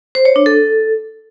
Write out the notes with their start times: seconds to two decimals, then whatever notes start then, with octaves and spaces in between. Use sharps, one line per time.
0.15 C5
0.25 C#5
0.36 D4
0.46 A4